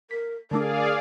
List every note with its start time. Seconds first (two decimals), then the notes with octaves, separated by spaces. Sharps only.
0.11 A#4 B6
0.51 D3 A3 D4 G#4 A#4 D5 F5